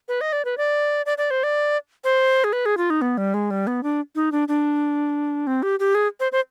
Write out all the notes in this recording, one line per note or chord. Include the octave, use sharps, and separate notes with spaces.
B4
D#5
D5
B4
D5
D5
D5
C5
D5
C5
G#4
B4
G#4
F4
D#4
B3
G3
G#3
G3
B3
D4
D#4
D4
D4
C4
G4
G4
G#4
C5
C5